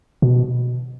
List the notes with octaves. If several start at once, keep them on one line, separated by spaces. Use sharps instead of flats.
B2